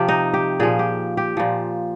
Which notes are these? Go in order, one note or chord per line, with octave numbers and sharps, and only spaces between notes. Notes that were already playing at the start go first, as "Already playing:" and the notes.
Already playing: C3 F3 G4
D#4
G4
A#2 F3 G#4
G4
G4
A#2 F3